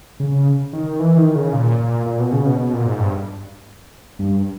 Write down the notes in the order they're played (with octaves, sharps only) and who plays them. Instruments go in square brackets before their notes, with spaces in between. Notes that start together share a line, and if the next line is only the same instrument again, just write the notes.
[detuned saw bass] C#3
D#3
E3
D#3
C#3
A#2
A#2
A#2
B2
C#3
B2
B2
A#2
G#2
G2
G2